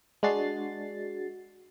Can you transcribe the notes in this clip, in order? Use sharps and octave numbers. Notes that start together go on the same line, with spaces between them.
G#3 D4 F#4 A6 C7